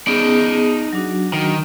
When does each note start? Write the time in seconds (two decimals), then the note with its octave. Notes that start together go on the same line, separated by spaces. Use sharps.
0.07 B3 C#4 D#4 G#4 D5
0.93 F#3 D4 F#4
1.33 D#3